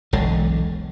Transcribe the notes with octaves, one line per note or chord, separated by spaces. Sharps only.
E1 B1 D3 G#3